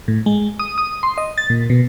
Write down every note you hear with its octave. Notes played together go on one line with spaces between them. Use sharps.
A2
G#3
D#6
D#6
C6
D#5
A6
A#2
B2